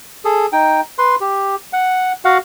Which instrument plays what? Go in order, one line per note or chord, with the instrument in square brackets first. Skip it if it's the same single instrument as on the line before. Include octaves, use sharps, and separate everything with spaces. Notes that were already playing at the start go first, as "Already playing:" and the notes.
[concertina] G#4 A4
D#4 G5
B4 C6
G4
F#5
F#4 F5 F#5